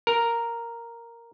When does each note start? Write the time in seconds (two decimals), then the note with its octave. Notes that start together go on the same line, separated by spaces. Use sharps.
0.07 A#4